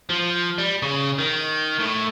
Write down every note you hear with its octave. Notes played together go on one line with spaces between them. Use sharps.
F3
G3
C#3
D#3
A2